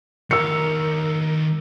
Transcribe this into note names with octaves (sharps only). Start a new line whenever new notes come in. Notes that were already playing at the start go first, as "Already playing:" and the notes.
D#3 A#4 C#5 E6 C#7